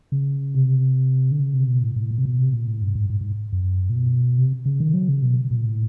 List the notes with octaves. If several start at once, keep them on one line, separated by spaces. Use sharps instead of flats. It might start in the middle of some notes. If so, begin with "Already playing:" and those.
C#3
C3
D3
C#3
C3
B2
A2
A2
A#2
C3
B2
C3
A#2
A2
G2
G#2
G#2
G#2
F#2
A#2
B2
C3
C#3
D#3
F#3
C#3
B2
A#2
A2